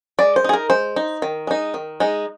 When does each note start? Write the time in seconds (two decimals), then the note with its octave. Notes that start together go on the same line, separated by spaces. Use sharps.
0.19 G#3 D5
0.36 C5
0.44 D#4 G#4
0.53 A#4
0.70 G#3 C5
0.96 D#4
1.22 D#3
1.47 G#3 D#4
1.74 D#3
2.00 G#3 D#4